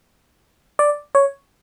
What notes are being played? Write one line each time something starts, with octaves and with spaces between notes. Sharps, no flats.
D5
C#5